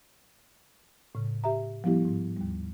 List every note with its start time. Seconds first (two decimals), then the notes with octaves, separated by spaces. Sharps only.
1.15 A2 C#3
1.44 G4 E5 A#5
1.84 F3 G3 B3 E4 G4
2.05 G#2
2.37 D#2 G3